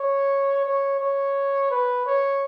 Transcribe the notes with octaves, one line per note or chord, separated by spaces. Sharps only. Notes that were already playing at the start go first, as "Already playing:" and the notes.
Already playing: C#5
C#5
C#5
B4
C#5